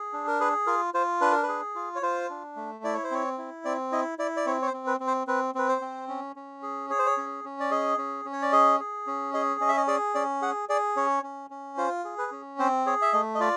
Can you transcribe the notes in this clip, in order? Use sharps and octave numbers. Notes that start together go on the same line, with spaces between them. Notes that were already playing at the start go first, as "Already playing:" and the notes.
Already playing: G#4
D4
A#4
G#4 B4
F4 A#4
F4 C5
D4 B4
A#4
B4
G#4
F4
C#5
F4 C5
D4
A3
E4 D5
C#5
C5
C4 C#5
E4
C4 D5
E4 D#5
E4 D5
D5
C4 C#5
C#5
C5
C4
B4
C4
C5
C4 B4
C4 B4
C5
C4
C#4
C#4
G#4
G#4 C#5
C5
C#5
C#4
C#4
D5
G#4 D#5
C#4
C#4
C#5
D5
G#4 D#5
G#4
C#4
G#4 D#5
C#4 D#5
E5
D#5
G#4 D5
C#4 D5
G#4 F#5
G#4 D5
C#4 C#5
C#4
C#4
F4 C5
G#4
B4
C#4
C4 C5
G#4 C#5
E5
A3 D#5
D#5
F4 D5